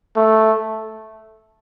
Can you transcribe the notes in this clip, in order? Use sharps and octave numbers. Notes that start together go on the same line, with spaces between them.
A3